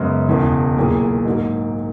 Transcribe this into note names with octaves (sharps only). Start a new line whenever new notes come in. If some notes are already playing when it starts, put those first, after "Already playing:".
Already playing: F#2 C#3 G#3 B3
E1 E2 C#3 E3
B1 A#2 A#3 E4 G#4
G#2 F#3 A#3